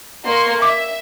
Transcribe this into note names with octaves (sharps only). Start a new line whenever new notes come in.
A#3 C6 C#6
E5 D6